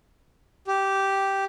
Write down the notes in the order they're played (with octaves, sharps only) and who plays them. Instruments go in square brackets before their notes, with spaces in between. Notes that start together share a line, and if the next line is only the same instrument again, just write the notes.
[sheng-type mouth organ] G4